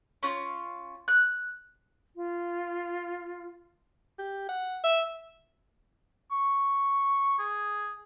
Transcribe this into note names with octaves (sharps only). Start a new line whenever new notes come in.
C#4 F4
F#6
F4
G4
F#5
E5
C#6
G#4